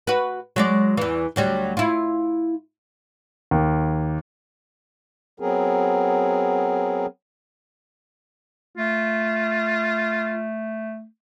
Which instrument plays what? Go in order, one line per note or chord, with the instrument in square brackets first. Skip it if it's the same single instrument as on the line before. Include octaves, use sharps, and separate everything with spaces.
[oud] F#4 B4
F#3 G#3 D5
E2 E3
D2 F#3 G3
E4 F4
[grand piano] D#2
[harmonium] F#3 B3 C4 G#4 A#4
[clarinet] A3 [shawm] F4